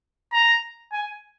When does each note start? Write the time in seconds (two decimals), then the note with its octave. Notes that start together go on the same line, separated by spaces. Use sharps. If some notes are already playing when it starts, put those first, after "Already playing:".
0.33 A#5
0.93 G#5